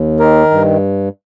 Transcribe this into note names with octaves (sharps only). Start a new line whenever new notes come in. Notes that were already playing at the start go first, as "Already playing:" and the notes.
Already playing: D#2
D#3 A#4
G2